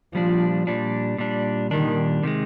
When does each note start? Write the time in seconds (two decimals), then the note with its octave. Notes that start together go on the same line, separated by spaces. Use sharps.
0.15 A#2 F3 G3 D4
0.67 A#2 G3 D4
1.18 A#2 G3 D4
1.70 A#2 D#3 G3 D4
2.23 C3 D#3 G#3